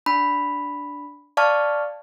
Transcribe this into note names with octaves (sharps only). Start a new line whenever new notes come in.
D4 B5
D5 F5 A5 C#6 F6